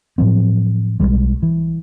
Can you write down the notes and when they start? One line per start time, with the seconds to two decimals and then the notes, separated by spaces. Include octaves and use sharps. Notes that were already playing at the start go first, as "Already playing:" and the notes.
0.18 A2 F3 F#3 C4
1.00 B1 F#2 G3 G#3
1.43 E3